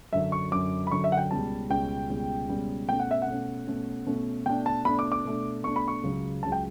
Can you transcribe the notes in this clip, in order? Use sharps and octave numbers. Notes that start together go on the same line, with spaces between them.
F#2 D3 F#3 E5
C#6
F#2 D3 F#3 D6
B5
F#2 D3 F#3 C#6
E5
F#5
G5
C#2 B2 G3 C#4 A5
C#2 B2 G3 C#4 G5
C#2 B2 G3 C#4
C#2 B2 G3 C#4
B2 A3 C#4 G5
F#5
E5
F#5
B2 A3 C#4
B2 A3 C#4
B2 A3 C#4
B2 A3 D4 G5
A5
B2 A3 D4 B5
D6
D6
B2 A3 D4
B2 A3 D4 C#6
B5
C#6
C#2 C#3 F#3
C#2 C#3 F#3 A5
G5